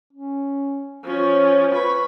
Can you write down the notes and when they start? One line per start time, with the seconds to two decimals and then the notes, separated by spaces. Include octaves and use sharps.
0.13 C#4
1.04 F3 C#4 C#5
1.74 B4 B5 C#6